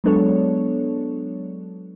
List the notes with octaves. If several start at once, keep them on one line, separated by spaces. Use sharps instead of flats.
F#3 G#3 B3 D4 A4 C#5